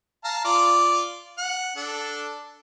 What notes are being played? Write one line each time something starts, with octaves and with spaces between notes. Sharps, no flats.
F5 A5 A#5
F4 D5 D6
F#5
D4 A4